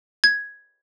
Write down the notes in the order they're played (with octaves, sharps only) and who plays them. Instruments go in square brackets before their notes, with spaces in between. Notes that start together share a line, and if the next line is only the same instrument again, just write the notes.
[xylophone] G#6